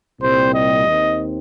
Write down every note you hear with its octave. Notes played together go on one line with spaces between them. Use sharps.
C2 A#2 G3 C4 C5
D#5
D#2 D#3 C4